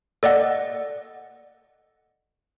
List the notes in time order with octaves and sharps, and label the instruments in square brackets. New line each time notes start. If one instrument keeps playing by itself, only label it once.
[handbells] A4 D5 D#5 F#5